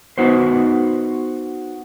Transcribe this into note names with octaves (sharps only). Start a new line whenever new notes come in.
B3 D#4 F#4 B4 C5